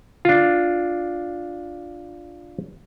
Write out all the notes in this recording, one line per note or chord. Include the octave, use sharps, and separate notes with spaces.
D4 F4